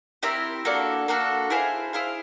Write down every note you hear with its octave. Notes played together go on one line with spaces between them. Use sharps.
C4 E4 G4 A#4
A#3 D4 F#4 A4
A#3 D4 F#4 A4
E4 G#4 C5 F5
E4 G#4 C5 F5